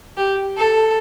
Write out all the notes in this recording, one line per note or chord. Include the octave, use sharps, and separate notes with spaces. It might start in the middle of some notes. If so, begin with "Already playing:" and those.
G4
A4